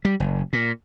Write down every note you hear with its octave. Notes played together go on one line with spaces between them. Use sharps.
G3
F#1
A#2